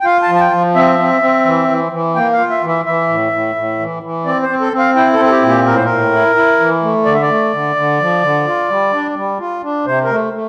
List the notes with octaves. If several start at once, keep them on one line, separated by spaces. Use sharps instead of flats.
G5
F4 F5
A5
F3
A5
G5
F3
C4 E5
C4
C4
E3
E3
E3
A#3 G5
F5
F4
E5
E3
E5
E3 E5
A2
A2
A2
E3
E3
C4 D5
C5
C4
A4
C4
F5
E4 G5
A4
C4
A4
G4
A#2
G4
A2 A#4
C5
A2 A#4
E4
E4
E3
A3
D3 D5
E5
D5
A3
D3
D3
F3
D3
F4
G3
D4
G3
F4
D4
C3 C5
A#4
A3
A3